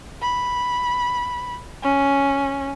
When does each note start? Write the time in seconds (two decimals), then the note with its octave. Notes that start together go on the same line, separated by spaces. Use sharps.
0.21 B5
1.83 C#4